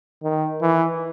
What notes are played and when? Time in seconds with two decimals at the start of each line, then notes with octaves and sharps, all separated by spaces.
0.23 D#3
0.61 E3